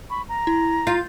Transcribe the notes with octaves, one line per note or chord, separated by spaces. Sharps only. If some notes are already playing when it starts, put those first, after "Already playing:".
B5 C#6
A#5
E4
F4 G6